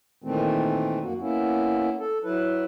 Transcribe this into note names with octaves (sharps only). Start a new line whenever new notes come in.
A#2 D#3 E3 A3 C4
F#2 A#3 F#4
A#3 B3 C#4 E4
A4
F#3 E4 B4